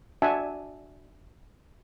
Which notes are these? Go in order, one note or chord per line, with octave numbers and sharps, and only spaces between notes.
D4 F#4 E5 F#5 G#5 A5